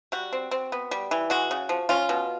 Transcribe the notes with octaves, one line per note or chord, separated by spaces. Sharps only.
G3 F#4
C4
C4
B3
G3
E3
G#3 F#4
C#3
F3
C#4 F4
B2